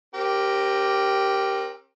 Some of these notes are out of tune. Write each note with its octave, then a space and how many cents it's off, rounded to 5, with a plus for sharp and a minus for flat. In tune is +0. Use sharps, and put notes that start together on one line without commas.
C4 +40 G4 -5 A#4 +0